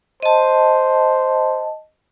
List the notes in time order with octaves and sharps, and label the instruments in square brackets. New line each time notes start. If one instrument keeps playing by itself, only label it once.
[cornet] C5 [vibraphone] D#5 A5